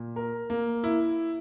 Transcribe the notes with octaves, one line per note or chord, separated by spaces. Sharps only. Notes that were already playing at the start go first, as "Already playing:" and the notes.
Already playing: A#2
A#4
A#3
E4